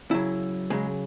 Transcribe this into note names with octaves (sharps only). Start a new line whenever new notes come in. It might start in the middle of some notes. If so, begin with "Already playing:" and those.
C#3 F#3 E4
C#3 F#3 G#3